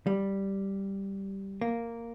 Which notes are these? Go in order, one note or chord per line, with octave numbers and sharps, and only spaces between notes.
G3
A#3